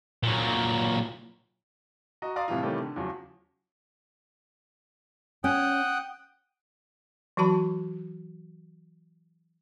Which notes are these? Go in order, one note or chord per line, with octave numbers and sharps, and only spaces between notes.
A#2 F#3
F#4 D#5 A#5
D5 F5 A#5 C6 D#6
A2 C3 E3 F3 G3 F4
C3 D#3 E3 G3 A3 C#4
D3
E2 C#3 F3 F#3
C#4 F#5 G5 D#6
E3 F#3 F#4 A5 B5